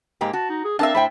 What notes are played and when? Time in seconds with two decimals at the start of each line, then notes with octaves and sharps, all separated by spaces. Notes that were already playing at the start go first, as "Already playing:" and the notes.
0.21 G#2 A#3 G4
0.33 F#4 A5
0.50 D#4
0.65 G#4
0.79 C4 D4 A#4 E5 F5 A5
0.95 A2 C5 G5 B5